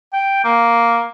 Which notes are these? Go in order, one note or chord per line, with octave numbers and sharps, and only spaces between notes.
G5
A#3